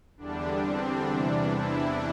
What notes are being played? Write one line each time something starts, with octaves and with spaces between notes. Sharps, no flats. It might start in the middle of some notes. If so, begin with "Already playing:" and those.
E2 D3 G3 D4
C4
E2 C3 E3 G3 D4
E4